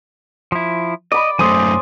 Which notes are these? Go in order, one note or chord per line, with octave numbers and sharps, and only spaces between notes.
F3 E4
D5 D#5 B5
F#2 A3 C5 G#5 D#6